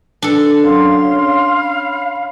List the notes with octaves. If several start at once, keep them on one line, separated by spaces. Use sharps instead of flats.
D4 A4
F#2 F5 C6
C#4
B5